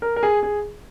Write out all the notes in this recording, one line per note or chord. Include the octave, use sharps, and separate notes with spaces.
A#4
A#4
G#4
G#4